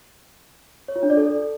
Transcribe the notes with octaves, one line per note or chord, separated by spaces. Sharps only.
C#5
F4
D4
D5
A4